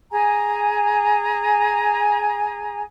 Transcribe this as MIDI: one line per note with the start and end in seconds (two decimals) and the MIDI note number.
0.10 2.81 68
0.10 2.81 80
0.10 2.81 82